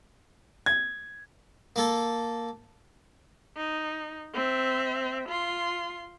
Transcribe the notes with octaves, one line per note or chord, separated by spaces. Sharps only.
G#6
A#3 A4
D#4
C4 E5
F4 C6